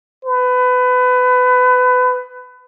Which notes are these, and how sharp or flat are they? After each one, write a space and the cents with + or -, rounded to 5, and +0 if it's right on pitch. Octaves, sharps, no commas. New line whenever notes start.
B4 +25